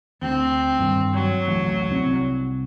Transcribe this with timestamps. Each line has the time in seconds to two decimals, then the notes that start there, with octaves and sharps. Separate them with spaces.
0.22 D2 C4
0.79 G2 D#3
1.14 F#3
1.48 A1 D2
1.90 C2 C4